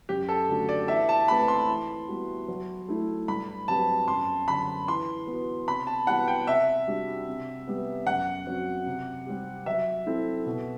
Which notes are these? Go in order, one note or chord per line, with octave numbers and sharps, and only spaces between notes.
F#2 G4
A4
D3 A3 D4 F#4
D5
E3 E5
A5
A3 C4 G4 B4 B5
C6
E3
G3 B3 F#4
F#3
A3 E4 A4
G2 B5
F#3 C4 G4 B4 A5
F#2 C6
D3 F#3 B5
E3 C6
B3 F#4
C3 B5
A5
E3 G3 B3 F#4 F#5
G5
C3 E5
G3 D4 F#4
C3
G3 B3
F#2 F#5
F#3 C4 F#4
C3
G3 C4 G4
F#3 E5
C4 E4 A4
B2